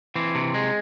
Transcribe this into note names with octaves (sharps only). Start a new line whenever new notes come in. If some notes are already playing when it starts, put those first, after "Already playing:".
E3 C4
C3
G#3